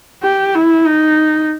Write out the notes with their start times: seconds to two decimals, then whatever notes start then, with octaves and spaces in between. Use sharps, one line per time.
0.23 G4
0.55 E4
0.86 D#4